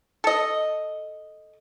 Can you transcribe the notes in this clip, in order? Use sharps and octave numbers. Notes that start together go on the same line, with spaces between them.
A4 D#5